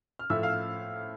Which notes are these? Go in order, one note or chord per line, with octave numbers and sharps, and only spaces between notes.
F6
A2 F3 A3 E5 E6
F5 F6